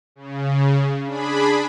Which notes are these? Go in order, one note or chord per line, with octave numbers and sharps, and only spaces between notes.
C#3
D4 G#4 B5